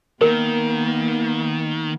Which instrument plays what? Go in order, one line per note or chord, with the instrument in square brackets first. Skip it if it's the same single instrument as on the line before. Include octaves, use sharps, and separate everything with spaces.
[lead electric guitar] D#3 [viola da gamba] A#3 B3 [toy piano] A#4